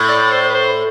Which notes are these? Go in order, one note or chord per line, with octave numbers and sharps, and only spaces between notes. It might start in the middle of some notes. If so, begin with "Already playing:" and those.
Already playing: A2
D5
C5
B4
C5